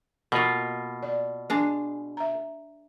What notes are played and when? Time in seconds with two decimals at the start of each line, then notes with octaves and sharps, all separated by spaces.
0.32 B2 A#3 F4 A4
1.03 D5
1.50 G#3 D4 G#4
2.17 E5 A#5